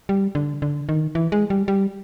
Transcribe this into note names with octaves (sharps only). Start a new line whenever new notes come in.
G3
D3
D3
D#3
E3
G#3
G3
G3